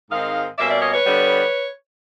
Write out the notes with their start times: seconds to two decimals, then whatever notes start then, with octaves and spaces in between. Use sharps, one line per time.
0.09 G#2 D#3 G#3 C4 D#5 F5
0.57 B2 G3 A#3 C#4 D5 E5
0.69 D5 E5
0.80 C#5 D#5
0.92 B4 C#5
1.05 D3 G3 B3